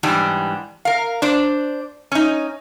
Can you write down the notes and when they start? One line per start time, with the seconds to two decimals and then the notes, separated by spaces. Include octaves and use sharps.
0.03 G#2 E3 G3 D4
0.85 A#4 F5
1.22 D4 C5 D5
2.12 C#4 D#4